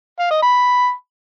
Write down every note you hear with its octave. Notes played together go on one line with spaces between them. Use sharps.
F5
D#5
B5